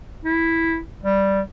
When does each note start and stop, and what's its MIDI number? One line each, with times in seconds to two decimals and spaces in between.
0.25 0.78 64
1.03 1.40 55